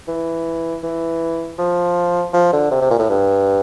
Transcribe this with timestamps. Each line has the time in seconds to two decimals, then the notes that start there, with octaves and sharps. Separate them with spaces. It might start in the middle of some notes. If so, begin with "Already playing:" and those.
0.08 E3
0.83 E3
1.59 F3
2.33 F3
2.53 D3
2.71 C3
2.81 C3
2.90 A#2
2.99 A2
3.09 G2